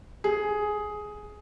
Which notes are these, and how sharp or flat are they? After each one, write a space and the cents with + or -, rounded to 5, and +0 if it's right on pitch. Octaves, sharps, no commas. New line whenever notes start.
G#4 +10